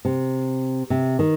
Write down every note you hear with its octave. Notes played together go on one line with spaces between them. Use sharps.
C3
C3
D#3